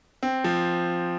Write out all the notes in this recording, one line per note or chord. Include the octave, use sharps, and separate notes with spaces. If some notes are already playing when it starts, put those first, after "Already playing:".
C4
F3